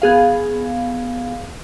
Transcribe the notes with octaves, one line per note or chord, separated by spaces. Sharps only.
B3 G#4 F5